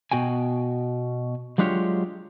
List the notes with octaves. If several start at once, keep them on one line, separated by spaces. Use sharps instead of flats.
B2 F#4 G5 G#5
F#3 G#3 D4 F4 G4 C#5